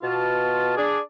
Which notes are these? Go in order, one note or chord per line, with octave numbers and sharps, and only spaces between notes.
B2 F4 A5
D4 G#4 D5